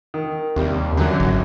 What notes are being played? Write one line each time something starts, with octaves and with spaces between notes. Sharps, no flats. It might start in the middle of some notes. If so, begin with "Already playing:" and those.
D#3
D#2 C3 G3
F#2 D3 F#3
G#1